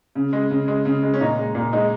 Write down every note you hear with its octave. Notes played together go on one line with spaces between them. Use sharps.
C#3
G#3
C#3
G#3
C#3
G#3
C#4
A#2 D#4
G#3
A#2
G#3 D#4